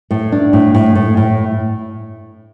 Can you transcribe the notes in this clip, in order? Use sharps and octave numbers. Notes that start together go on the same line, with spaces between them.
A2
D4
A2
A2
A2
A2